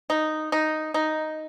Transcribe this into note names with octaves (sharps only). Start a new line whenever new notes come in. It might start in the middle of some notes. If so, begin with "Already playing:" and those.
D#4
D#4
D#4